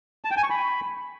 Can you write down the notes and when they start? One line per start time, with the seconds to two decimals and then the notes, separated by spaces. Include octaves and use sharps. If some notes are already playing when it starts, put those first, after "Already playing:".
0.25 A5
0.31 G5
0.37 G#5
0.43 C#6
0.50 B5